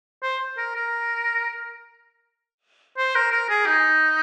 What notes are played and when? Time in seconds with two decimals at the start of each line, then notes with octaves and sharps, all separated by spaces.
0.23 C5
0.57 A#4
0.75 A#4
2.97 C5
3.15 A#4
3.32 A#4
3.49 G#4
3.66 D#4